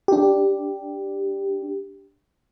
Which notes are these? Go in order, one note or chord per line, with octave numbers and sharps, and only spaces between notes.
D4 G4